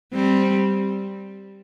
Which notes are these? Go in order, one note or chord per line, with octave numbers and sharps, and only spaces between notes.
G3 C4